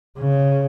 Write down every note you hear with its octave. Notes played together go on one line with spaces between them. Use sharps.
C#3